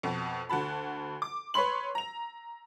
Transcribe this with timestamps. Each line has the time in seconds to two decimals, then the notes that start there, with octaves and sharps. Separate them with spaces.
0.03 F2 B2
0.49 D2 F#4 A5 B5
1.22 D6
1.54 B4 C#5 B5 C6 F#7
1.95 A#5 F7